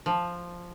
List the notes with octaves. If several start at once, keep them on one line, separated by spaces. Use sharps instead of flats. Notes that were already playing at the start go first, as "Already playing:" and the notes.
F3